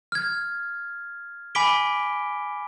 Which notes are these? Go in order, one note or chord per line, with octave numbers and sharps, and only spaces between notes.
F6 G#6
G#5 B5 D6 B6 D7 G7